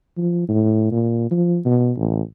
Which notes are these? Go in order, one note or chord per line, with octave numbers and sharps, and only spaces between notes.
F3
A2
A#2
F3
B2
A1